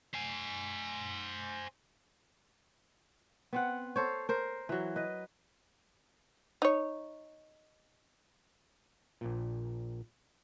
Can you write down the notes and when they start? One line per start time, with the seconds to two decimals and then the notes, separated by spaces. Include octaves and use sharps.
0.14 C5 G#5
3.53 B3 C4 F#5
3.96 A4 C5 C#5
4.29 A#4 C5
4.69 E3 F#3
4.96 B4 D#5
6.62 D#4 C#5
9.21 A#1 A#2